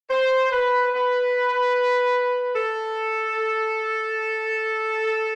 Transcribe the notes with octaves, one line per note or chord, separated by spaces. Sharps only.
C5
B4
B4
A4